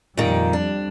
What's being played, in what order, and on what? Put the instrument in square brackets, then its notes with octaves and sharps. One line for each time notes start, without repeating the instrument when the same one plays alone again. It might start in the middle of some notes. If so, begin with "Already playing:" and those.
[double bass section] F2 G3 [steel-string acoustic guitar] A#2 D#3
[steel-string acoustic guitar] D4